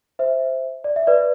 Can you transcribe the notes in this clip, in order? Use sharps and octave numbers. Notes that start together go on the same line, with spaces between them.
C5 E5
D5
E5
B4 D5